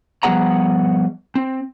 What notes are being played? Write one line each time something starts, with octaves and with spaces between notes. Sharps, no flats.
F3 G3 B3 G#4 F#5 A#5
C4